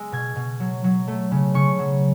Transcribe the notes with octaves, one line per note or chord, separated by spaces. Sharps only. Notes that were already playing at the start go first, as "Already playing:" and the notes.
Already playing: G#3 B3 E6
B2 G#6
B2
F#3
F#3
A3
C#3
C#3 C#6
F#3